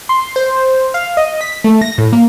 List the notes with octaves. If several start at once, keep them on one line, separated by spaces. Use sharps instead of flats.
C6
C5
F5
D#5
B6
A3
A#6
A2
A#3